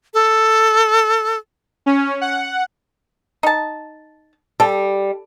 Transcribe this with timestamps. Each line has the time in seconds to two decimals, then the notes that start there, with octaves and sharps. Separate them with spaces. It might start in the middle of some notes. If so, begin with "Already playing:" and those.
0.14 A4
1.86 C#4
2.21 F#5
3.43 D#4 A5
4.60 G3 A4